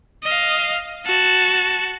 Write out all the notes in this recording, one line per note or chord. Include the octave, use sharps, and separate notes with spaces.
D#5 F5
F#4 A5